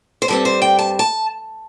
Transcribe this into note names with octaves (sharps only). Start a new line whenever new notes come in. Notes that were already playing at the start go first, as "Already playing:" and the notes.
C5
G2 G3 C4 A4
C5
G5
A5
A5